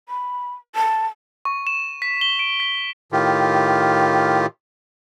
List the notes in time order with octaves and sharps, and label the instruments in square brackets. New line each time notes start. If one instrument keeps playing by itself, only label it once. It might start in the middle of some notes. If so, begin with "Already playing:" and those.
[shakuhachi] B5
A5
[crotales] C#6
E7
B6
G7
D7
B6
[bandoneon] A2 D#3 F4 G4